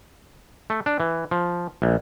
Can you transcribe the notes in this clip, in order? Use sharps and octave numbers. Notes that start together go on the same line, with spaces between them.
A3
D4
E3
F3
A#1